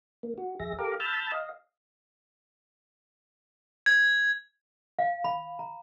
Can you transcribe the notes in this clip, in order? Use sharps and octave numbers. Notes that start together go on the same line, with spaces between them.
A#3
F#4
F2 G#4 E5 A#6
G4 A4 A#4 F5 A#5 D6
A5 B5 E6 F6 G6 A6
D#5 F5
G#6
F5
B5
A#5